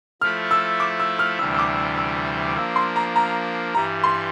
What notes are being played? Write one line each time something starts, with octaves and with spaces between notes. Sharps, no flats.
F3 A3 E4 A4 F6
E6
D6
E6
F6
D2 C3 E3 G3 D4 E6
E6
D6
E6
E6
F3 A#3 D4 E6
C6
A#5
A#5
G2 E3 G3 A#5
C6